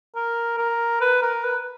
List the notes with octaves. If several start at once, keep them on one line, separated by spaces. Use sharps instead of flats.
A#4
A#4
B4
A#4
B4